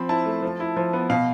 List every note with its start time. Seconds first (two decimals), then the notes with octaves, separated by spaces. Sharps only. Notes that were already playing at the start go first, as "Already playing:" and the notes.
Already playing: F3 C4 B5
0.09 E4 A5
0.26 A3
0.43 F3
0.60 E4
0.76 F3
0.93 B3
1.10 B2 F5